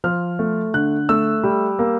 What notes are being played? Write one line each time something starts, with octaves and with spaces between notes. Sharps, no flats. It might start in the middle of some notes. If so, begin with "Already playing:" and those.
F3 F6
A3
D3 F#6
A3 E6
G3
A#3